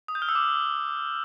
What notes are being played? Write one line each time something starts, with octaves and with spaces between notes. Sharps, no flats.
D#6
G6
F6
E6
D6